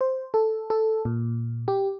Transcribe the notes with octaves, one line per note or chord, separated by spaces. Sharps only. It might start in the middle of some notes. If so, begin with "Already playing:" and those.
C5
A4
A4
A#2
G4